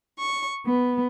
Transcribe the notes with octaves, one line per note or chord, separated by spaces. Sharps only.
C#6
B3